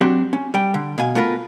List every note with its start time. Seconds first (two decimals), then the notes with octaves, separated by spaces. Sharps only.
0.01 F#3 C4 D4 F#4 G4
0.33 C#4
0.54 G3 G5
0.74 D3
0.98 B2 F5 G#5
1.15 A3 B3 F4 A#4 B4